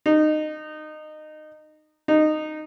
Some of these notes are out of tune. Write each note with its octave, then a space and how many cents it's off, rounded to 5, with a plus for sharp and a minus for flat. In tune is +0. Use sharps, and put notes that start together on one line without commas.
D#4 -20
D#4 -15